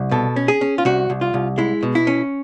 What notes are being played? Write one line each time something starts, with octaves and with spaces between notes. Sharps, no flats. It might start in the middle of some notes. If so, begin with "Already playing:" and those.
Already playing: C2
B2 A4
C#4
G#4
C#4
F4
C2 F#4
C2
F4
C2
G#3 E4
B2
E4
C#4